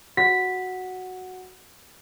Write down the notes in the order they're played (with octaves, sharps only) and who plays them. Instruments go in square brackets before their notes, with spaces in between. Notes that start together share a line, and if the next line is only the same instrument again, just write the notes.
[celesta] F#4 F#5 [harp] B6